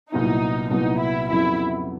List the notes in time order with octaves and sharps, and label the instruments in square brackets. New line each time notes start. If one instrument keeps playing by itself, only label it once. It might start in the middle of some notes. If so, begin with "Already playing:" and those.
[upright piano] C2 A#2 F#3 B3 E4 [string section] D#4
[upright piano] C2 A#2 F#3 B3 E4 [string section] D#4
[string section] E4
[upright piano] F2 C#3 F#3 B3 [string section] E4